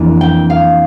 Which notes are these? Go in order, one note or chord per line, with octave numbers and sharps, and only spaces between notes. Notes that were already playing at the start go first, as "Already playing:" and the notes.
Already playing: F2 E3 A#3 D4
G5
F5